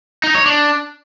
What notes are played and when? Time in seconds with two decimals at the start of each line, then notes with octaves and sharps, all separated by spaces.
0.24 D#4
0.35 C#5
0.46 D4